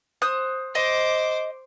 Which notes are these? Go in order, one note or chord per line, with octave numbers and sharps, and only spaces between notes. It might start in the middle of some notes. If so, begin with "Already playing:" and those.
C5 D#6 F#6
C5 D#5 D6